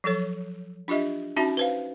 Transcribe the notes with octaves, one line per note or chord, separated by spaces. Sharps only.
F3 F#3 A4 C#5
D4 F4 G4 D#5 E5
C#4 D#4 F#4 E5 A5 A#5
B4 C5 F5